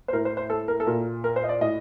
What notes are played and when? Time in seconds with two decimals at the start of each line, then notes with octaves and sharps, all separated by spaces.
0.08 C5
0.13 A2 A#4
0.25 C5
0.37 C5
0.50 A4
0.68 A#4
0.80 A4
0.87 A#2 A#4
1.24 A#4
1.36 C5
1.44 D#5
1.49 D5
1.61 A2 D#5